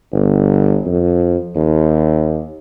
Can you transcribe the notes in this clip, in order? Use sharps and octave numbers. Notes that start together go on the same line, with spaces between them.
G1
F2
D#2